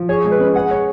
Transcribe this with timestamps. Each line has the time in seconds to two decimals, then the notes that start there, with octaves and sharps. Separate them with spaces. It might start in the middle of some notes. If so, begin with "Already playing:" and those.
Already playing: F3
0.09 G#4 C#5
0.25 G#3
0.31 B4
0.40 C#4
0.54 G#4 F#5
0.71 C#5